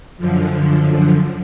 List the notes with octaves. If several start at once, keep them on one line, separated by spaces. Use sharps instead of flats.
F#2 D3 F3